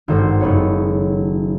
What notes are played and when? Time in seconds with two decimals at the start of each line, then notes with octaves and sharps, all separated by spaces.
0.08 G#1 G2 D#3 F#4 A4 C5
0.41 F#1 B3 C#5